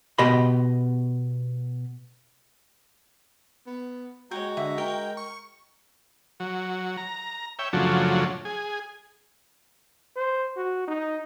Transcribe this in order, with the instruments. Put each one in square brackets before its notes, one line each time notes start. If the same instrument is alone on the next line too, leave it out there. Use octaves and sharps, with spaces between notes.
[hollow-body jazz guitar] B2 G4 D#5 B5 C6
[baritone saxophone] B3
[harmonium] G#3 A#5 [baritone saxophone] F#4 [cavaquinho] C#5 G5
[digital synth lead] D3 [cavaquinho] E5
[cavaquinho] A#4 [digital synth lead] G5
[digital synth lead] C#6
[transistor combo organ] F#3
A#5
C#5 E5 G5
F#2 C#3 F3 F#3 A3 D4
G#4
[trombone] C5
F#4
D#4